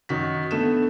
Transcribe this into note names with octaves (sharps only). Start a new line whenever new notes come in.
F#2 D#3 F#4 B6
D3 A3 B3 E7